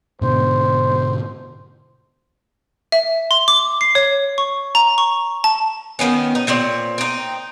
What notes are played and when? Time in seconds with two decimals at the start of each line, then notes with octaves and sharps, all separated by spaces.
0.21 G#2 B2 D3 C5
2.92 E5
3.31 C6
3.48 D6
3.81 C7
3.95 C#5
4.38 C#6
4.75 A#5
4.98 C#6
5.44 A5
5.99 D#3 F3 B3 C#4
6.35 D#4
6.47 A#2 C4 C#5 D5
6.98 C4 D#4